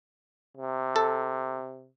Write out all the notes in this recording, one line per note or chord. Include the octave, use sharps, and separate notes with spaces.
C3
A4